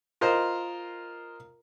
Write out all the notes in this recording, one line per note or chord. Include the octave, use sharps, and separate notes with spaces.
F4 A#4 C5 D#5